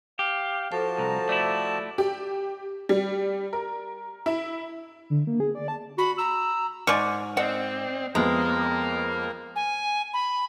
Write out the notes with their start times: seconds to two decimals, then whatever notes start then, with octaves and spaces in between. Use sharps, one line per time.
0.19 G4 F5
0.72 F3 F#4 A4 C5 A5
0.98 C2 A#5
1.29 A3 E4 D5
1.98 G4
2.89 G3
3.53 A#4
4.26 E4
5.10 D3
5.27 A#3
5.40 G#4
5.55 D5
5.68 A5
5.98 F#4 B5
6.18 A#5 E6
6.87 G#2 D5 G#5 C#6 F6
7.37 C4 D5 D#5 F#5
8.15 F2 G#3 B3 A#4 F5
9.56 G#5
10.13 B5